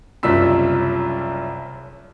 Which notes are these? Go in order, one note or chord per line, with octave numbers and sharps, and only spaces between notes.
F#1 C2 F#2 F4 E6 B6